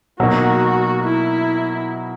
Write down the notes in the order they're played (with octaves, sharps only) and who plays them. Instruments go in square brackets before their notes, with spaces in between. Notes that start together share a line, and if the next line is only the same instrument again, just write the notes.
[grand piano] B2 F#3 A#3 D#4 [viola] F#4
[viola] E4